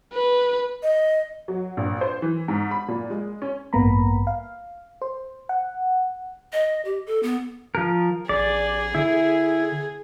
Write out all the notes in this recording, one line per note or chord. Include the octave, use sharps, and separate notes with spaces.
B4
D#5
F#3
A#1
C5
E3
G#2
B5
A#2
G#3
C#4
A1 G2 A#3 B3 A#5 B5
F5
C5
F#5
D#5
G4
A4
B3
F3 A#4
A1 G#4 D5
D3 E4